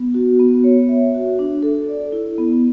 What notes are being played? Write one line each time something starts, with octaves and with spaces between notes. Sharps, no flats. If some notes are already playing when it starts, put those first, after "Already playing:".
Already playing: B3
F#4
B3
C#5
E5
F#4
D4
A4
D5
E4
B3